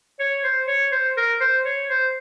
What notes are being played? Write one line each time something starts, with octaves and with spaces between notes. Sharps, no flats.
C#5
C5
C#5
C5
A#4
C5
C#5
C5